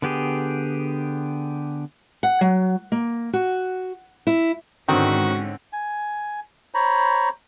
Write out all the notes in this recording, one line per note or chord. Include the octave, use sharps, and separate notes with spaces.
D3 B3 G4 G#4
F#5
F#3
A#3
F#4
E4
G#2 D3 D#3 C4 C#4 F#4
G#5
C5 C#5 A#5 B5